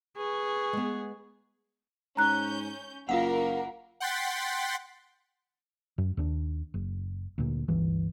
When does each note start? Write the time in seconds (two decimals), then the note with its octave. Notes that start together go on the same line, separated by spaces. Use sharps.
0.17 G#4 B4 C#6
0.73 G#3 B3
2.17 G#2 C#4 A#5 F#6 G6
3.09 F#1 A#3 F4 F#4 A#4 F5 F#5
4.00 F#5 G5 C6 A6 B6
5.98 F#2
6.17 D#2 D4
6.74 F#1
7.38 D2 A#2
7.68 G1 C#2 E3